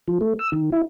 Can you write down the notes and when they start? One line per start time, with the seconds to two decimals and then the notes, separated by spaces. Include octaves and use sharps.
0.08 F3
0.21 A3
0.39 E6
0.52 D#3
0.72 E4